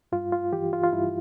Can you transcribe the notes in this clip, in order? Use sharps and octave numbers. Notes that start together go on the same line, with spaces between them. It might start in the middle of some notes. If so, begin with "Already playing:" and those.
G2 F4
F4
E3 G4
F4
F4
G2 E4